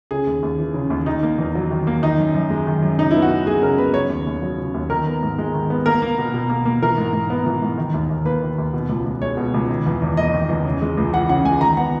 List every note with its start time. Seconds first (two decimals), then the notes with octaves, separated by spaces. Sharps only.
0.11 C#3 G#4
0.27 D#2
0.43 D#2
0.59 E3
0.74 C#3
0.90 D#2
1.06 D#3 D#4
1.23 A#3
1.38 E2
1.55 F#3
1.71 D#3
1.87 A#3
2.02 D#3 D#4
2.18 F#2
2.35 F#2
2.50 G#3
2.67 D#3
2.82 F#2
2.98 C#3 D#4
3.11 B3 E4
3.22 F#4
3.30 F#2
3.46 G#3 G#4
3.62 C#3 A#4
3.78 B3 B4
3.94 C#3 C#5
4.10 D#2
4.27 D#2
4.42 F#3
4.58 C#3
4.74 D#2
4.90 D#3 A#4
5.06 B3
5.23 G#2
5.38 G#3
5.54 D#3
5.70 B3
5.86 A#3 A#4
6.02 A#3
6.18 B2
6.34 B2
6.49 A#3
6.66 A#3
6.83 E3 A#4
6.98 G#2
7.13 G#2
7.30 B3
7.46 E3
7.62 G#2
7.77 D#3
7.94 D#2
8.10 D#2
8.25 A#3 B4
8.42 D#3
8.58 D#2
8.73 B2
8.89 C#2
9.05 C#2
9.22 G#3 C#5
9.37 B2
9.54 C#2
9.69 D#3
9.86 E2
10.02 E2
10.17 A#3 D#5
10.33 D#3
10.49 E2
10.65 C#3
10.82 G#3
10.97 C#2
11.13 E3 F#5
11.29 C#3 F#5
11.45 G#3 G#5
11.61 D#3 A#5
11.77 B3 F#5